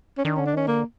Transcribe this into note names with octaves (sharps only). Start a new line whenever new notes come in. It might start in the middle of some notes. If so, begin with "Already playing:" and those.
C#4
D#3 D4
C#4
D3
D4
D#3 C#4
D3 A#3